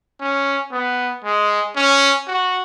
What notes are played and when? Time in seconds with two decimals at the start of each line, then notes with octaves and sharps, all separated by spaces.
0.21 C#4
0.72 B3
1.25 G#3
1.76 C#4
2.28 F#4